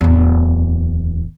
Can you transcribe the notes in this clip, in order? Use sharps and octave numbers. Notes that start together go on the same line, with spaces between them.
D1 E2